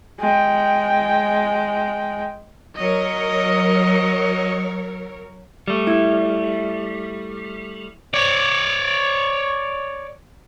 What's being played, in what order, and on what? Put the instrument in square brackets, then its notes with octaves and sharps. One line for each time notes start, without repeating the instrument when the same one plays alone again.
[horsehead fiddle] G#3 G5
[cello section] F#3 A#4 C#5 [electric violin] D#5
[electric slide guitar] G3 A3
[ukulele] E4
[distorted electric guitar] C#5 D5